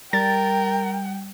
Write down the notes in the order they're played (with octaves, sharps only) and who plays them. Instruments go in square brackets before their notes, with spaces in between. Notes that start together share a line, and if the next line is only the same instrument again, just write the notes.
[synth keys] G3 [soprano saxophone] A#4 [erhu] G5 [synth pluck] A6